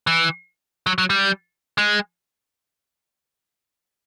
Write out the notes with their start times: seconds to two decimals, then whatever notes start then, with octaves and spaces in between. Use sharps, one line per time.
0.07 E3
0.87 F#3
0.98 F#3
1.10 G3
1.78 G#3